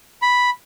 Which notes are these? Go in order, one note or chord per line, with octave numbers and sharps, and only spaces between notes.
B5